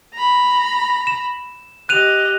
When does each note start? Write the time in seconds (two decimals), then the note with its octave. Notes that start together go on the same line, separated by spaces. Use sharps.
0.13 A#5 B5
1.07 E7
1.89 G4 D#5 F#6 D#7 F7